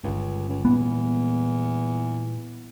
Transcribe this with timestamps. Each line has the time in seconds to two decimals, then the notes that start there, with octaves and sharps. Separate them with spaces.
0.04 G1 C#2 G2
0.49 C#2
0.65 E2 A#2 G3 G#3 B3